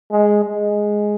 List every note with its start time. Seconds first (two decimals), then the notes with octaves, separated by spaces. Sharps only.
0.12 G#3
0.44 G#3